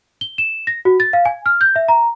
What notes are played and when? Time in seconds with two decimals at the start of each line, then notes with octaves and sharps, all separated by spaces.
0.21 G7
0.38 E7
0.67 A#6
0.85 F#4
1.00 A6
1.13 F5
1.25 G#5
1.46 F6
1.61 G6
1.76 E5
1.88 A#5